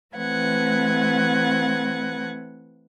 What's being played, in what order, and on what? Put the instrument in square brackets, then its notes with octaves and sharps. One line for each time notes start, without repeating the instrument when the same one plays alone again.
[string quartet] E3 A3 C4 B4 F#5 G#6